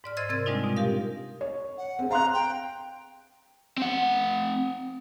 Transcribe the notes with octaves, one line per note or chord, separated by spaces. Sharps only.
G#2 D5 F6
C5 D#5 C6 E6 G#6 A6
C3 C4 A#4 G#6 A6
G3 G#3 C4 D4 D#4 F4
B2
G4 A#4 F5
C#5
F#5
C4 G#4
F5 A#5 C6 F#6
G5
C4 F#5